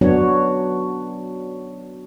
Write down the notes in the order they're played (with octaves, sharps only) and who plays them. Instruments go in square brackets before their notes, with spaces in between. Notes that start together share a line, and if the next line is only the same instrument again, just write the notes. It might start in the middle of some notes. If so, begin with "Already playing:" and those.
[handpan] F#3 B3 D4 F#4 C#5